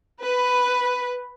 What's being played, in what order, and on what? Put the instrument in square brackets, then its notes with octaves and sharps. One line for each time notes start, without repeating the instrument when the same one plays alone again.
[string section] B4